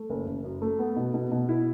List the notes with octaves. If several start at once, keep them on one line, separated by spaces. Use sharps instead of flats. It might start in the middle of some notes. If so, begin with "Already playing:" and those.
Already playing: A3
F#1
F#1
F#2
A3
B3
B2
B2
B2
E4